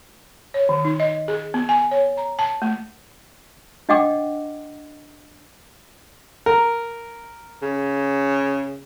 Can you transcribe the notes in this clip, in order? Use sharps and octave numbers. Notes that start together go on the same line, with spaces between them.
C#5
D#3
D#4
D#5
G#4
B3
G#5
C#5
A#5
A5
A3
D4 D#5 F#5 G5 D6
A#4
C#3